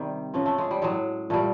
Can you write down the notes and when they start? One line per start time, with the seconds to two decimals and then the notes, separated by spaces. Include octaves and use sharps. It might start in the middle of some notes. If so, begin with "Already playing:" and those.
Already playing: C3 D#3 G3
0.34 C#3 F3 C#4
0.46 A3
0.58 G#3
0.71 G3
0.82 A2 F#3 G#3
1.30 A#2 G3 A3